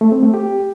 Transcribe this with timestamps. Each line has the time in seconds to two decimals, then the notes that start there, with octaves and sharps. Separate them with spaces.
0.01 A3
0.12 C4
0.23 A3
0.34 G4